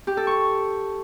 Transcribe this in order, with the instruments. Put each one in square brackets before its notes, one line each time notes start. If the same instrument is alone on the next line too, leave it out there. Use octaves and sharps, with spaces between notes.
[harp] G4
A4
C#6